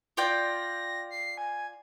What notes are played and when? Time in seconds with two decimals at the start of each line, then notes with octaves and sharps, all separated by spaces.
0.17 F4 D5 G5 A#6
1.11 C7
1.38 G#5